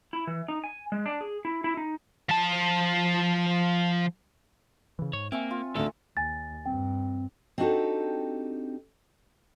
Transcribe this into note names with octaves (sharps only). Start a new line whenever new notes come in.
E4
E3
D#4
G#5
G#3
D4
G#4
E4
E4
D#4
F3 A5
C#3 E3
G#2 C#5
A#3 C4 E5 G#5 C#6
F4
D2 D3 D#3 A4 C#6
D#2 G#5 A6
G2 C4 G5
C4 D4 D#4 F#4 G4 A4